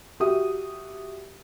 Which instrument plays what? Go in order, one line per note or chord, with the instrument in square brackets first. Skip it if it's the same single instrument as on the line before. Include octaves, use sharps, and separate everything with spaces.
[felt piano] F#4 G4 E5 D#6